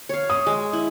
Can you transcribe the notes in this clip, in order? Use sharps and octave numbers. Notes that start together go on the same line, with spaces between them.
C#5 F5
D#6
G#3
E4